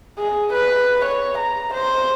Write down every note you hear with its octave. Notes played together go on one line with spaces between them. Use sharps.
G#4
B4
C#5
A#5
C5